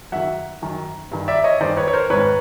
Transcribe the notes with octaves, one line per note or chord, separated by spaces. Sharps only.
F#2 D#3 E5 F#5
F#2 D#3
G2 D#3
D5 E5
C#5 D#5
G2 D#3 C5 D5
B4 C#5
C#5
A#4 C5
G#2 D#3 B4 C#5